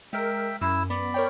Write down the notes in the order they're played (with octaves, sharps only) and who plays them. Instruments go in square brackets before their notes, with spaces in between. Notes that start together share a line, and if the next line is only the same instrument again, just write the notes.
[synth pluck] G#3 A#4 [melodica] E5 G5
[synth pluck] F#2 [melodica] E4 E6
[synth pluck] B3 [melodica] D5 B5
[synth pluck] A#4 C#5 G5